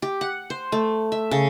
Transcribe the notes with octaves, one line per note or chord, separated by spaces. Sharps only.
G4
F#5
C5
A3
E5
C#3